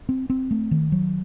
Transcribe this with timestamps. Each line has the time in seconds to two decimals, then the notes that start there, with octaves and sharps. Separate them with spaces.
0.09 C4
0.30 C4
0.51 A3
0.71 D#3
0.92 F#3